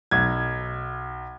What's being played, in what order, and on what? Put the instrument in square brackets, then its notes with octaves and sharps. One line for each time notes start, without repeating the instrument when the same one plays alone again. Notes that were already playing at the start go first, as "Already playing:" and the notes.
[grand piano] B1 G#6